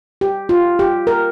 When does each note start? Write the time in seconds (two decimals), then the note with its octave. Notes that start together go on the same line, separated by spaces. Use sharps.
0.21 G4
0.49 F4
0.79 G4
1.07 A#4